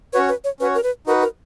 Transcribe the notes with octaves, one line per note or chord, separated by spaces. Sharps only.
C#4 F#4 B4 C#5
B4
C#5
C#4 F#4 B4 C#5
A#4
B4
D#4 F#4 A#4 B4
A#4